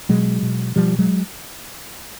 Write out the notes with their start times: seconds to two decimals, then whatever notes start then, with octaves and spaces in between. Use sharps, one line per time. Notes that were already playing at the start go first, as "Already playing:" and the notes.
0.09 B2 F#3 G#3
0.42 B2
0.76 B2 F3 G3
0.99 F#3 G#3